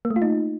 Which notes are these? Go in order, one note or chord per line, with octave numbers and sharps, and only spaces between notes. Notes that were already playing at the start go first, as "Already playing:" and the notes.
A#3
A3
F4
D#4